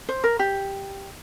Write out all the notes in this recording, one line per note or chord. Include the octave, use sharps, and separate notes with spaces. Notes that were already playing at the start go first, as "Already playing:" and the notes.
C5
A#4
G4